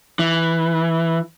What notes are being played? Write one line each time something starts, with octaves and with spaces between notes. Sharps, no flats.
E3